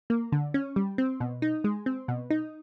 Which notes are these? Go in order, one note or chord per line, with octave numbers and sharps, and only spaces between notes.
A#3
D3
C#4
G3
C4
B2
D#4
G#3
C4
B2
D#4